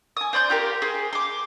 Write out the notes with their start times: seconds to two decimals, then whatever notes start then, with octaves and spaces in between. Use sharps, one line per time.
0.17 G#5 D#6
0.33 C5 D5 C6 G6
0.50 F4 G4 A#4
0.82 G#4 C5
1.13 C6 D6